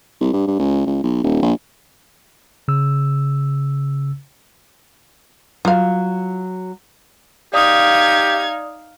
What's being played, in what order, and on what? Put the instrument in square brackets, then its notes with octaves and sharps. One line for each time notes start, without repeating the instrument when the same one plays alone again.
[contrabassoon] C2
G2
G2
C#2
C#2
B1
D#1
A#1
[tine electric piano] C#3 E6
[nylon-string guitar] F#3 [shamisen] F4 F5
[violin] D#4 G#6 [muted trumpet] G4 [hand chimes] D5 D#6 [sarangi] F5